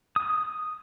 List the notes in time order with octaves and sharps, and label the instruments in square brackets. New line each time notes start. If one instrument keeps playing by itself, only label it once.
[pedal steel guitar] D#6